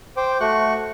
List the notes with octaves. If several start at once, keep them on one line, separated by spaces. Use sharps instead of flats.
C5 G5 D6
A3 F#4 C#6 F#6